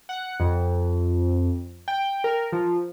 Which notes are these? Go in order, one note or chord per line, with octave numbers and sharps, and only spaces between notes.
F#5
F2
G5
A#4
F3